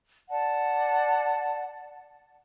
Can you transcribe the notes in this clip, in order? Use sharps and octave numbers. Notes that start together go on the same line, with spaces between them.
D5 F#5 A5